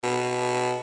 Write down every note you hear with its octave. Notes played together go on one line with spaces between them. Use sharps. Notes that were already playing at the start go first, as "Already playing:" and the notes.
B2